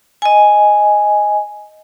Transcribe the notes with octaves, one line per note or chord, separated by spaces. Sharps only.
D#5 G#5